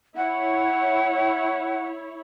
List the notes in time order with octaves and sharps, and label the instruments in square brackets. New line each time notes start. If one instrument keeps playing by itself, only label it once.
[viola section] E4 C#5 [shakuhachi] F#5